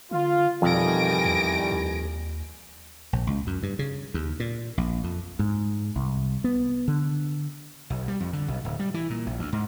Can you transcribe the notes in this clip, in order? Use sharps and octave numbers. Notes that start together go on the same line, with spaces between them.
D3 F4
F2 B2 D#3 E3 G3 G#5 A#6 D7
E2
D#2
A#1
C#2
F#2
G2
C#3
D#2
A#2
A#1
F2
G#2
C2
B3
D3
B1
G3
F2
D3
B1
D1
G3
E3
A#2
A#1
D2
G#2